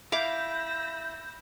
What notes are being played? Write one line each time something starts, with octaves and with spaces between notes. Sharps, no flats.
E4 F5 B5 D6 E6 G6 A#6